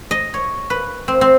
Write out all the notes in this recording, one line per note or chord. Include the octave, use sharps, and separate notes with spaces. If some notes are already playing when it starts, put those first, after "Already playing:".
D#5
C#5
B4
C4
C4